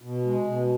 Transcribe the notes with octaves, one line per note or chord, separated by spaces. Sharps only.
B2
G#3
B2